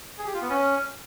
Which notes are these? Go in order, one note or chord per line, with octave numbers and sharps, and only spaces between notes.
G#4
G4
F4
B3
C#4